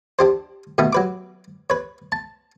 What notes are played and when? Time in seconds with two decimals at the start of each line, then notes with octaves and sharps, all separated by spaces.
0.19 D4 G4 C5
0.78 B2 D#3 A3 B3
0.93 F#3 B4 D6
1.70 B4 C#5
2.12 A5